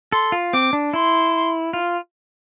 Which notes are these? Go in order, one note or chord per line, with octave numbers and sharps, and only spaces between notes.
A4 C6
F4
C4 D6
D4
E4 C6
F4